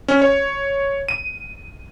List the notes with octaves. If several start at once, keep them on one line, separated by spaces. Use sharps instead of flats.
C#4
C#5
D#7